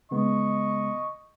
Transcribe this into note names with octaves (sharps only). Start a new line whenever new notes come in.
C#3 G#3 B3 D#5 C#6